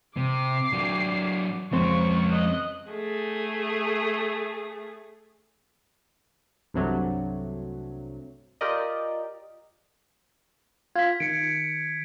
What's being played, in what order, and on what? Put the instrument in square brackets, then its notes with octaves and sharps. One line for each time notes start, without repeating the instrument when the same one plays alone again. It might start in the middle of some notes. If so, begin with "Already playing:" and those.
[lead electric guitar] C3 [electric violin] D6 C7
[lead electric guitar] F#3 D4
[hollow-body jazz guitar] F2 C4 C6 [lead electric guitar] G#3 C#4 [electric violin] C#6
[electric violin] D#5 F#6
[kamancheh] A3 G#4
[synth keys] C2 G2 C3 F#3 A3
F4 G4 A#4 D5 D#5
[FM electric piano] F4 F5 [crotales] G#6 B6
[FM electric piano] D#3 [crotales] C#7 D7